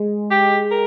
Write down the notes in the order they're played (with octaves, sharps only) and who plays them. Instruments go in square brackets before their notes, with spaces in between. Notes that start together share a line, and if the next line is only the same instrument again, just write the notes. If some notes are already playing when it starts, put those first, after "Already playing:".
Already playing: [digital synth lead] G#3
[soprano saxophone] G4
A#4